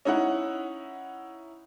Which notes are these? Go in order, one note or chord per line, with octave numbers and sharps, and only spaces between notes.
C#4 D#4 E4 F#5